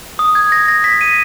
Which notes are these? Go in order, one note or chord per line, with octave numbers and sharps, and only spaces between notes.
D#6
G#6
A#6
A#6
B6
D#7